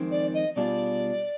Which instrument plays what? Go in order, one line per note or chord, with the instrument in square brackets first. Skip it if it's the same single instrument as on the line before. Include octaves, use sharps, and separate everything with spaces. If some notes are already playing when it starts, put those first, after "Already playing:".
Already playing: [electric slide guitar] F2 D#3 G#3 C4
[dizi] D5
D#5
[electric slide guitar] B2 G3 D4 F4 G#4 [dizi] D5